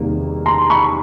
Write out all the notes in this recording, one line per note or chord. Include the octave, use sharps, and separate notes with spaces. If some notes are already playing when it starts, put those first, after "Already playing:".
Already playing: E2 C3 D#3 G3 A#3
A#5 C6
B5 C#6